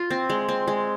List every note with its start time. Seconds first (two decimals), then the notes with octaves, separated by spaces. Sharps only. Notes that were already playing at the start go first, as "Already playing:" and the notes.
Already playing: F4
0.10 C4
0.30 G#3
0.49 C4
0.68 G#3